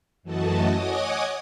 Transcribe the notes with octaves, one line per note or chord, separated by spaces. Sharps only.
F#2 E3 A3 F#4 D#5 A5
C#5 D#5 F#5 G#5 D6 D#6